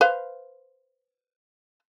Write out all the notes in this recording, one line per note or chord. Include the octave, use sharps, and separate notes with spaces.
B4 C5 F5